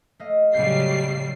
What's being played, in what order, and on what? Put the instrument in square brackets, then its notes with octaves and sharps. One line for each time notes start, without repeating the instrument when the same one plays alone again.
[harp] A3 D#5 F5
[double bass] A2 C#3 [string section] F#3 G3 C7 [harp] G6 C#7